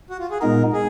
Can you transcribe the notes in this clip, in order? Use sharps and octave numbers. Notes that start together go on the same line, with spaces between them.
F#4
F4
G#4
A#2 G#3 B3 D#4 A#4
G#4